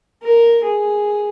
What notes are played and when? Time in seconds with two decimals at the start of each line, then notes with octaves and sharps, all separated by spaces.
0.23 A#4
0.64 G#4